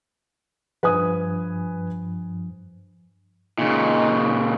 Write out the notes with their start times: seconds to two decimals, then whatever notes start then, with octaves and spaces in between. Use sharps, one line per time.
0.83 G2 F3 B4 G#5 D#6
3.59 A#2 C#3 D#4